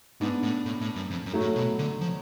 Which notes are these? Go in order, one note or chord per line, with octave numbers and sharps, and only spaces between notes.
G#2 B3 D4
A2
A2
A2
F#2
F2
F#2
F#3 A3
A2
B2
D3
F3